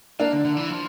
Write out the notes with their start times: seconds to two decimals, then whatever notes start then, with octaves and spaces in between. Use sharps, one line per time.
0.20 A#3 D4
0.33 D3
0.45 D3
0.57 E3
0.70 F3